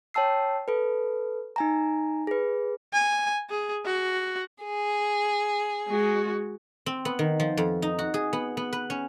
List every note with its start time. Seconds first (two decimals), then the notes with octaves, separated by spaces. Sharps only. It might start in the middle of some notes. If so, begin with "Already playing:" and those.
0.14 C#5 G5 A5 E6 C7
0.68 A4 B4
1.56 D#4 G#5 A#5
2.27 G#4 B4
2.93 G#5
3.50 G#4
3.86 F#4
4.63 G#4
5.88 G#3 F#4
6.86 C4
7.05 B3
7.19 D#3
7.40 F3
7.57 F2
7.82 D#4
7.99 F#4
8.14 G#4
8.33 B3
8.57 B3
8.73 B4
8.90 C#4